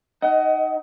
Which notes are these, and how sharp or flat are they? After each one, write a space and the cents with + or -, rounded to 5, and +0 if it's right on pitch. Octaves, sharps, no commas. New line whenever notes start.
D#4 +0 D#5 +20 F#5 +30